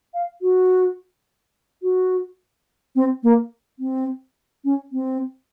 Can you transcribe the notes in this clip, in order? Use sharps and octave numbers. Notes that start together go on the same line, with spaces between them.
F5
F#4
F#4
C4
A#3
C4
C#4
C4